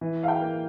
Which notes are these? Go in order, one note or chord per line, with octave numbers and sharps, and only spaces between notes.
E3
F5
G5
A#3